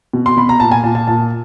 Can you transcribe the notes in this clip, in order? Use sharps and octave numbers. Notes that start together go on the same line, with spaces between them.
B2
C6
B2 B5
A#5
A#2 A5
G#5
A#2 A5
A5
A#2 A5